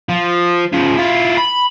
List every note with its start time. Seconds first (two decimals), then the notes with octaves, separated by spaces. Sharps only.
0.09 F3
0.73 C#3 F3
0.97 E4 F4
1.38 B5